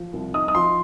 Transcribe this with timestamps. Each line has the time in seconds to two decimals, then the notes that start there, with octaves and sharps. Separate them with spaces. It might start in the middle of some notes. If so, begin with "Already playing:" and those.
Already playing: F3
0.13 C2
0.34 D#4 D#6
0.48 D#6
0.55 F3 C6